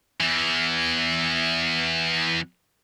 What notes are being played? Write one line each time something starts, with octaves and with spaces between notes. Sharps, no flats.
E2 E3